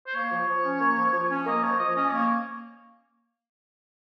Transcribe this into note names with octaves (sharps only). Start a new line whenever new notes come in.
C5
A#3 C#5
F3
F3
C#4
A#3
F3
F3
C#4
A#3 D#5
F3 C#5
F3 D#5
C#4 D#5
A#3 C#5